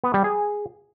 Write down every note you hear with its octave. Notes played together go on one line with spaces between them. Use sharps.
B3
G3
G#4